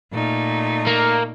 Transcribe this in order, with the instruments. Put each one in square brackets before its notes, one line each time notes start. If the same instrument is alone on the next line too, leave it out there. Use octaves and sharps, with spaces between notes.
[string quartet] A#2 A3 D#4
[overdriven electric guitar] A#3